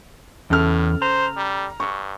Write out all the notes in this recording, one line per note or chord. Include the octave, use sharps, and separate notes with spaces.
E2 A2 C#3 A4 F6
C5 A#5
G3
G2 C#6